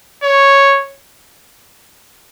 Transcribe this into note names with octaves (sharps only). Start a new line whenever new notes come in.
C#5